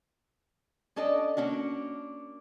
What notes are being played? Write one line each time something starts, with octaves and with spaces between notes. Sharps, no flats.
C#4 D4 A4 D5 D#5
A#3 C#4 D4 F#4